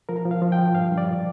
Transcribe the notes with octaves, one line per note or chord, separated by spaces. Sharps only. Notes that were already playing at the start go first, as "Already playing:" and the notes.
F3 A#4
F3
F5
F3
G5
F3
G2 F5
G2
D5
F3